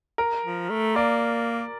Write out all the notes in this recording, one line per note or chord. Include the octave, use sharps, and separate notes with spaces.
A#4
F3
A3
A#3 D5